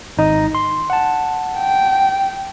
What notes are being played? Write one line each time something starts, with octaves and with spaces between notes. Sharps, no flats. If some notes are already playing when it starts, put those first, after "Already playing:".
G#1 D#4 D#5
C6
F#5 A5
G5